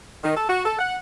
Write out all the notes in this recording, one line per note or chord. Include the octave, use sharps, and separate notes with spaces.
D#3
A4
F#4
A4
F#5